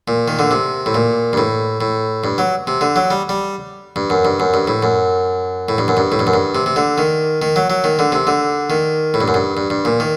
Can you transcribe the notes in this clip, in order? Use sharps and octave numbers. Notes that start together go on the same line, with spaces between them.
A#2
D#3
D3
C3
A2
A#2
G2
A2
A2
G2
F#3
C3
D3
F#3
G3
G3
G2
F#2
G2
F#2
G2
A2
F#2
A2
G2
F#2
G2
A2
G2
F#2
G2
C3
C3
D3
D#3
D#3
F#3
F#3
D#3
D3
C3
D3
D#3
A2
G2
F#2
G2
G2
G2
A#2
D#3